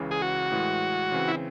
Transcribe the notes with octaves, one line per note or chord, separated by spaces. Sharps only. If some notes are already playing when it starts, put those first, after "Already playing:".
Already playing: C#2 C#3 E3
G#4
F#4
A2 E3 G#3
C#3 E3 C4
E4